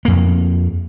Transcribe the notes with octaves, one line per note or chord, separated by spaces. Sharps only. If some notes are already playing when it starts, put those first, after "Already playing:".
F2 A#3